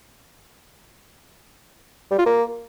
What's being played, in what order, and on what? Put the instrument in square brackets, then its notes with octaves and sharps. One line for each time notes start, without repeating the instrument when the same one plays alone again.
[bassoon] G3
F4
A#3